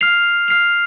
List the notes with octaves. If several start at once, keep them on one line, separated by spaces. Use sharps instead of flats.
F6 C7 F7
F6 C7 F7